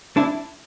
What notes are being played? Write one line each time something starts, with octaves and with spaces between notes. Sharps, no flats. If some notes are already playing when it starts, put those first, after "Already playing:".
D4 E4